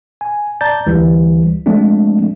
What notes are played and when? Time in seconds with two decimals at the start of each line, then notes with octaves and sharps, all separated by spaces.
0.21 G#5
0.61 D5 A5 A#5 G6 A6
0.87 D2 E3 G3
1.66 F3 G#3 A3 C4 D4